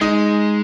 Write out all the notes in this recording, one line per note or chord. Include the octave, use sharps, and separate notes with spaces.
G#3 D#4